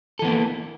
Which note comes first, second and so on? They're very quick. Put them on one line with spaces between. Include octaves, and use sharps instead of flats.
A4 E3 B3 A#3